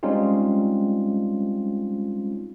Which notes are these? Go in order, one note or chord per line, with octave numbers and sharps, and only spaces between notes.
G3 G#3 C4 C#4 D#4 F4